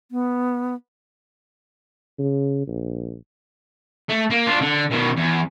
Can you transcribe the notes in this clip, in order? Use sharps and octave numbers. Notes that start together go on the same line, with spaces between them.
B3
C#3
A#1
A3
A#3
D4 F4
D3
B2 D#3
E2